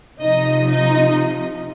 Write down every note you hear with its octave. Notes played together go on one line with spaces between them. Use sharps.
C3 F3 D#4 D#5
D#4 D#5